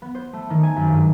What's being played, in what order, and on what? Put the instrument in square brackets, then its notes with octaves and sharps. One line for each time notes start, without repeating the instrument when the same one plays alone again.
[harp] B3
C5
A3
D#3
G#5
F#2
G2